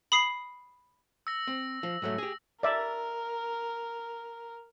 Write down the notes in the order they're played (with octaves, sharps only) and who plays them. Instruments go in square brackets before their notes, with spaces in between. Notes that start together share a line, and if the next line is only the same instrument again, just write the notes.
[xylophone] B5 D#6 C7
[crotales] E6 A#6
[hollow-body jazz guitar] C4
F3
G#2 F#3 A3
G4 G#4
[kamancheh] A#4 [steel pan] D5 E5